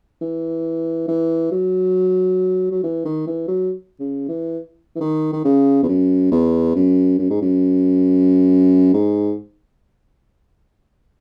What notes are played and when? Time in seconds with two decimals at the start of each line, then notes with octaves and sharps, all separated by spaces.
0.21 E3
1.08 E3
1.52 F#3
2.71 F#3
2.84 E3
3.05 D#3
3.27 E3
3.48 F#3
4.00 C#3
4.29 E3
4.96 E3
5.01 D#3
5.33 D#3
5.45 C#3
5.83 E2
5.88 F#2
6.32 E2
6.75 F#2
7.19 F#2
7.30 G#2
7.42 F#2
8.93 G#2